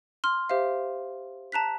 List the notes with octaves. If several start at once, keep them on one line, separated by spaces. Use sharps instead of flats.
C6 F6
G4 C5 E5 F5
A5 A#5 F#6 B6